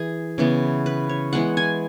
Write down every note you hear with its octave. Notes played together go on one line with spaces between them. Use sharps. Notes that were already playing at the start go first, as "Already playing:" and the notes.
Already playing: E3 G#4
C#3 E3 B3
B4
C#5
E3 G#3 B3 F#5
G#5